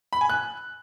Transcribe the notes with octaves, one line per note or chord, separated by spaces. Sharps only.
B5
G#5
F#6